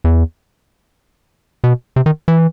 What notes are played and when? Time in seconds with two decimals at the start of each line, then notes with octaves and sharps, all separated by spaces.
0.04 E2
1.64 B2
1.96 C3
2.06 D#3
2.28 E3